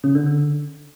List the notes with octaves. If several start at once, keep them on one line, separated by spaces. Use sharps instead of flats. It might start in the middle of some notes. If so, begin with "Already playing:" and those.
C#3
D3
D3